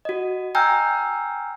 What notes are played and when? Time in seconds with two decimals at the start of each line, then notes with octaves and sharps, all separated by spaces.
0.05 F#4 D#5
0.55 G5 G#5 A#5 E6 F6 G6